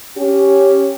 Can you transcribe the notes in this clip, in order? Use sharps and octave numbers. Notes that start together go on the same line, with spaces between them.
C#4 G4